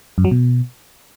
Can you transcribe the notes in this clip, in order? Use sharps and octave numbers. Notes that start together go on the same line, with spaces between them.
F#2
F#3
B2